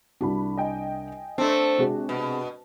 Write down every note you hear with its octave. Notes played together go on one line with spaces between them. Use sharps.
C2 D4 F#4 B5
D#5 G5 G#5
A3 C4 D4
C3 G#3 F#4
B2